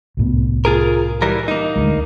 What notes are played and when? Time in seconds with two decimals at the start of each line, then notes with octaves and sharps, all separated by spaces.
0.17 C2 A2 B3
0.65 F4 G#4 A#4
1.22 E3 G3 A#4
1.48 A#3 D#4
1.76 D2 G#3